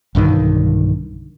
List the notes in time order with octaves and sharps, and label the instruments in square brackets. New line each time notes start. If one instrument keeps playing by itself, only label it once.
[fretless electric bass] B1 G2 D3 D#3